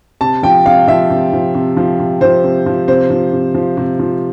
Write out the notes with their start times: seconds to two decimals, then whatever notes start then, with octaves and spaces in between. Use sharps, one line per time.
0.21 C3 A5
0.43 F3 G5
0.65 C3 F5
0.87 F3 E5
1.10 C3
1.33 F3
1.55 C3
1.77 F3
1.99 C3
2.21 F3 C5
2.44 C3
2.66 F3
2.88 C3 C5
3.10 F3
3.33 C3
3.54 F3
3.77 C3
3.99 F3